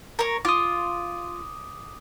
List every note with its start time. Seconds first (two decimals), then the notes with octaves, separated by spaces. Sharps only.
0.19 A#4 C#5
0.45 F4 D6 D#6